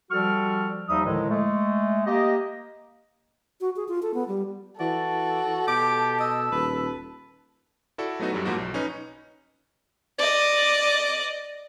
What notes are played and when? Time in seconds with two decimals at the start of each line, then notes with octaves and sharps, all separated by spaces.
0.11 F3 G3 F#4 A4 C#6 F6
0.89 D#2 F3 G3 D#4 E5 D#6
1.04 A2 D3 D#3 F3 G#3
1.29 G#3 A3
2.06 A#3 G4 D#5
3.61 F#4
3.76 G#4
3.88 F4
4.03 A4
4.14 B3
4.28 G3
4.80 E3 F#4 A4 D5
5.68 B2 G4 D6
6.20 D#5 E6
6.52 D#1 B4
7.98 E4 F#4 A4 D5
8.20 F#3 A3 B3 D#4 F#4
8.33 F#2 F#3 G3
8.45 G#2 F3 G3 A#3 D#4 F#4
8.58 B1
8.74 C#4 D#4 B4
10.18 D5 D#5